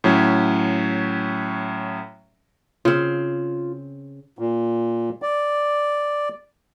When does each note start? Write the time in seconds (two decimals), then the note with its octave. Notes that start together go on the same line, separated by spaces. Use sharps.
0.04 A2 F#3 C#4
2.85 C#3 C4 F4
4.39 A#2
5.22 D5